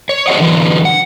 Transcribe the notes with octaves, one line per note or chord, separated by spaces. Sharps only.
C#5
F#4 A4 C5 D5 D#5 F#5
D3 E3 F#3
F#5